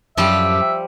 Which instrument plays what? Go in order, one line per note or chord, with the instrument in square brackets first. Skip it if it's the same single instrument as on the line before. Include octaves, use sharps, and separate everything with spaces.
[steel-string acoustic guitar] F#2 A2 G4 [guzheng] F3 G3 [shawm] E5